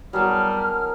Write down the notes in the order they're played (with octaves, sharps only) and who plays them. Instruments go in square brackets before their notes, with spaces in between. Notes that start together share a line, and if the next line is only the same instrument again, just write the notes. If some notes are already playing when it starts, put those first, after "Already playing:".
[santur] F#3 B3 E4 [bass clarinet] G3 [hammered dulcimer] G#4 A#4 A5 [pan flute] F6